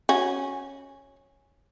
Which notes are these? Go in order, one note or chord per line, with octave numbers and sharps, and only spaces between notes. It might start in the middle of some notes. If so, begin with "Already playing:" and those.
C#4 F#4